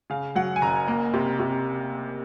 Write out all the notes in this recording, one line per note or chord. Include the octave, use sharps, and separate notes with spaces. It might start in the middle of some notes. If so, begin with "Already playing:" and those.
C#3 F5
F#3 F#5
G#5
F#1 A#5
A#3
C3
C3